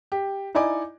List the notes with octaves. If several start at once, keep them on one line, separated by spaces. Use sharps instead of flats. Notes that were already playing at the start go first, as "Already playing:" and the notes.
G4
D#4 E4 D5 D#5 G#5 D6